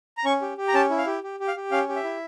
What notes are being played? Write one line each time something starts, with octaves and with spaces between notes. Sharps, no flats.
A#5
C#4 C#6
G4
G4
A#5
C#4 A5
E4
F5
G4
G4
G4
F5
G4
C#4 F5
G4
E5
E4